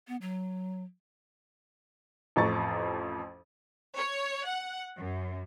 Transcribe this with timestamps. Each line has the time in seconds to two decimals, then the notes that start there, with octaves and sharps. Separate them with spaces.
0.08 B3
0.21 F#3
2.36 A1 F2 A#5 C#6 A6
3.95 C#5
4.46 F#5
4.97 F#2